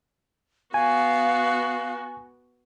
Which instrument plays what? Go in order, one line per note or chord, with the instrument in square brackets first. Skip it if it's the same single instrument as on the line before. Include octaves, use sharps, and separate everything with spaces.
[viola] B3 F#4 [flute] F5 [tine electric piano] G#5